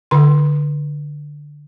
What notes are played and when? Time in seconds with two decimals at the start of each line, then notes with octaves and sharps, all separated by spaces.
0.11 D3 C6